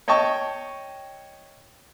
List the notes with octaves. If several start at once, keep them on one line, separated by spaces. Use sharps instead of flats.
C#5 D#5 G5 A5 C#6